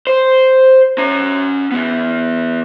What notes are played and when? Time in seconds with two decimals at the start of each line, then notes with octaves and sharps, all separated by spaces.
0.07 C5
0.98 C#4 A#5
1.71 E3 B3